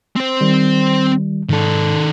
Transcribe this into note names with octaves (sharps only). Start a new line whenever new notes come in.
C4 C5
D#3 G3
G#2 D#3 A4